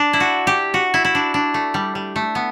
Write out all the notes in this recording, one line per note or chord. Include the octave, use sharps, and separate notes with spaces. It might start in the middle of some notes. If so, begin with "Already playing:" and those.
Already playing: D4
E4
F#4
G4
F#4
E4
E4
D4
D4
A3
G3
G3
A3
B3